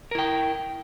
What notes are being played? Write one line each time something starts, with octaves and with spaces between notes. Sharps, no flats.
E4 A#4 G5